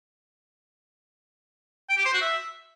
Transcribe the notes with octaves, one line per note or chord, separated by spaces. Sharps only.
G5
G4
C5
F#4
E5